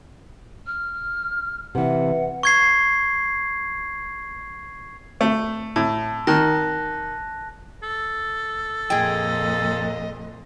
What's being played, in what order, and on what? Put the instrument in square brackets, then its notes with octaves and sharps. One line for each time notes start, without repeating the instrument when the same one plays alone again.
[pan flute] F6
[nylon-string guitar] C3 E3 [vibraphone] B4 E5 [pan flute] F#5
[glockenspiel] C#6 G#6 C7
[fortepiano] A3
[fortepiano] A2 [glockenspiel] A5
[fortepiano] D#3 [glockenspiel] A5 F#6 A#6
[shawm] A4
[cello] F2 A#2 [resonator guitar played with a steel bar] G#4 G5 [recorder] D#5